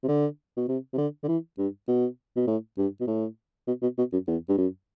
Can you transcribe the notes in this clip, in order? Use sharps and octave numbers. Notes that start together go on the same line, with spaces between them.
C3
D3
B2
C3
C3
D3
D3
E3
G2
B2
B2
A2
G2
B2
A2
B2
B2
B2
F#2
E2
G2
F#2